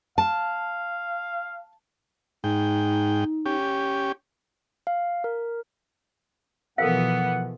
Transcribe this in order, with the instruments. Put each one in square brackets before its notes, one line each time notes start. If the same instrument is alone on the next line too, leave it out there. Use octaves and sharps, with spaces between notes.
[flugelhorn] F5 [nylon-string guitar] A5
[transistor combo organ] G#2 G5 [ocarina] D#4
[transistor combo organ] C#4 G4
[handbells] F5
A#4
[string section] B2 F3 [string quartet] E3 B3 [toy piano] A4 A#4 F5 [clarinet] F#5